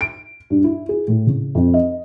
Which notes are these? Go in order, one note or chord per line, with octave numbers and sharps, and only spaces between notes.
D7
G2
E4
G#4
A2
C#3
F2
D#5